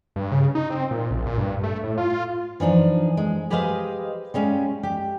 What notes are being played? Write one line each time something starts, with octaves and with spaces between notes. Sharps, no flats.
G2
C#3
D#4
C4
A#2
A#1
A#2
G2
A3
A2
F4
E3 F3 D4 D#4
G#3
G4 G#4 B4 C5 D#5 F5
G3 G#3 C#4 F5
G4